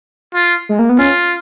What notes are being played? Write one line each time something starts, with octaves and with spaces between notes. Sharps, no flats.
F4
G#3
A#3
B3
C#4 F4